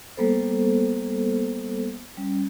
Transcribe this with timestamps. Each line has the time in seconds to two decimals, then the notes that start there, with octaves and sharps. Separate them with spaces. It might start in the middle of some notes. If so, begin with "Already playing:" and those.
0.17 G3 A#3 B3 A4 C5
2.17 G3 C#4